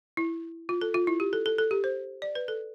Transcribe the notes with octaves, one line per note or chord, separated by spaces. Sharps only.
E4
F4
A4
F4
E4
G4
A4
A4
A4
G4
C5
D5
B4
A4